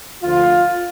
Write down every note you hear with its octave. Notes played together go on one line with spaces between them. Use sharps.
D2 D3 F3 F4